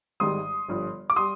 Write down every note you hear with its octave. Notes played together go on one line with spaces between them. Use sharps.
G#1 G#2 D#3 G3 C6 D#6
G1 G2 F3
D6
G3 C6 D#6